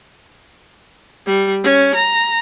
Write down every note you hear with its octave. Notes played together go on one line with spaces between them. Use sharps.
G3
C#4
A#5